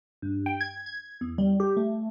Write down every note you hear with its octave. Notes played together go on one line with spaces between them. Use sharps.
G2
G5
G#6
G#6
E2
G3
G4
A3